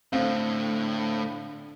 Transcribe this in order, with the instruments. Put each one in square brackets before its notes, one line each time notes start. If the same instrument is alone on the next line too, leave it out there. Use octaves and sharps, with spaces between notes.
[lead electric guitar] A2 [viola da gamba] D3 [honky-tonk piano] C4 [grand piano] F5